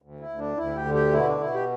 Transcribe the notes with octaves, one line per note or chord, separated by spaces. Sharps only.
D2
E4
D2
D4
D2 E4
G4
D3
G4
B2 E4
D4
B2 E4
G4